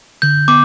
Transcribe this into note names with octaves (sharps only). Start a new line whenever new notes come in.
D3 G6
B3 D6